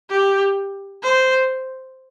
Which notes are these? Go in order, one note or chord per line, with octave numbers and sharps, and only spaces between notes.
G4
C5